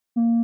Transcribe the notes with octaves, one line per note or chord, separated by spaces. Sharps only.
A#3